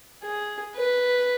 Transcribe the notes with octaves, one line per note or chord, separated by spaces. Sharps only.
G#4
B4